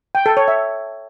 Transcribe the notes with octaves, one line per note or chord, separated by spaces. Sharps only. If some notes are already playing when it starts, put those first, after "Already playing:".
G5
A4
C#5
E5